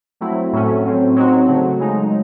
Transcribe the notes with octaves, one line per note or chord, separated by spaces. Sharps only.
F#3 A3 C4 E4
A2 F#3 A3 C#4
A2 F#3 C4
F#3 C4 D#4 F#4
C#3 F#3 A3
C#3 G#3 D#4